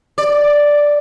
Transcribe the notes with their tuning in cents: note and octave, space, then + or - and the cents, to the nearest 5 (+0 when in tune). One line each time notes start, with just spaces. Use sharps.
D5 +0